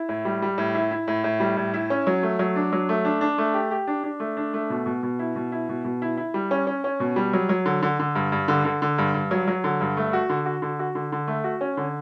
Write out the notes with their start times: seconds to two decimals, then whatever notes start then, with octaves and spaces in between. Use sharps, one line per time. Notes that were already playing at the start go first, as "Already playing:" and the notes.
Already playing: E4
0.09 A2
0.25 G3
0.42 G3
0.58 A2
0.75 E4
0.91 E4
1.08 A2
1.24 A2
1.40 G3
1.57 A2
1.74 E4
1.90 C#4
2.07 F#3
2.23 A3
2.39 F#3
2.56 D4
2.73 F#3
2.89 A3
3.05 D4
3.21 D4
3.38 A3
3.54 G4
3.71 G4
3.87 D4
4.04 D4
4.20 A3
4.37 D4
4.54 A3
4.70 B2
4.86 B2
5.03 B2
5.19 E4
5.36 B2
5.52 E4
5.69 B2
5.84 B2
6.02 E4
6.17 E4
6.34 G3
6.51 C#4
6.67 C#4
6.84 C#4
7.00 B2
7.16 G3
7.33 F#3
7.49 F#3
7.66 D3
7.82 D3
7.99 D3
8.15 G2
8.32 G2
8.48 D3
8.65 D3
8.82 D3
8.98 G2
9.14 G2
9.31 F#3
9.48 F#3
9.64 D3
9.81 G2
9.97 A3
10.13 F#4
10.29 D3
10.46 F#4
10.62 D3
10.79 F#4
10.95 D3
11.12 D3
11.28 A3
11.44 F#4
11.61 C#4
11.77 D3